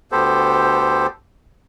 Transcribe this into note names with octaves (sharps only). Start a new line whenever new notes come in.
D2 B3 G4 A4 C5